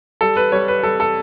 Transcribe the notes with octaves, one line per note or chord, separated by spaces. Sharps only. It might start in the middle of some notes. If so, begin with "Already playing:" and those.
G3 A4
B4
G3 C#5
B4
G3 A4
A4